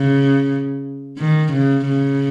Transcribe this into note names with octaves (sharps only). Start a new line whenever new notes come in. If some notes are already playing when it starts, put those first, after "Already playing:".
Already playing: C#3
D#3
C#3
C#3